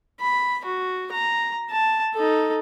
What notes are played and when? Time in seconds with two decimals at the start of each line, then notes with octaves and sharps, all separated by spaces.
0.20 B5
0.65 F#4
1.12 A#5
1.70 A5
2.14 D#4 A4